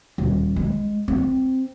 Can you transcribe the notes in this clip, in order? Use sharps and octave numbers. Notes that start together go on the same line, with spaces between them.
D#1
G#3
C4